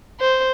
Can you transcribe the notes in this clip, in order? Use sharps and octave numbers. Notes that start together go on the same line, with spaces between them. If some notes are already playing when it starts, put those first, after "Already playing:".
C5